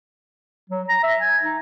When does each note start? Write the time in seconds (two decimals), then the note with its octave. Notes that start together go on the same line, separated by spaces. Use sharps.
0.70 F#3
0.89 A#5
1.03 E5
1.20 G#5
1.43 D#4